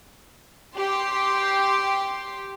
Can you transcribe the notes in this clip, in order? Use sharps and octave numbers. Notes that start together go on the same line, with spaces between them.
G4 C6